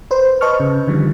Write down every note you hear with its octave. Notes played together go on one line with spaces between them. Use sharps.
B4 C5
B4 D#5 A5 C#6 F6
C#3
D3 D#3 F3 G3